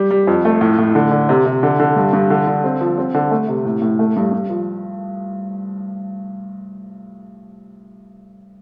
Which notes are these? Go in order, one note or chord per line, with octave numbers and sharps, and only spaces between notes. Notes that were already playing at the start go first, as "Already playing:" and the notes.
Already playing: G3
G3
F2
A3
A2
A2
D3
D3
C3
C3
D3
D3
G2
G2
D3
D3
C4
F3
C4
D3
A3
C3
A2
A2
A3
G2
G2
F3